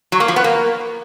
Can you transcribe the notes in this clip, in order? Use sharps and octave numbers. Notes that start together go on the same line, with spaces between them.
F#3
A#3
F3
B3
A#3